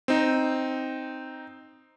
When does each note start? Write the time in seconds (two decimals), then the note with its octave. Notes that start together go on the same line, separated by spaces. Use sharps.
0.08 C4 D#4